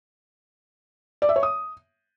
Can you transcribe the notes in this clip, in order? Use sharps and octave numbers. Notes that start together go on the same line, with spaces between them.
D5
E5
C#5
D#6